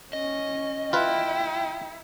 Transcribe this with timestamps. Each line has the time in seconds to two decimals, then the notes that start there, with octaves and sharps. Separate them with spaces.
0.13 C#4 D#5
0.93 E4 F4 B4 G5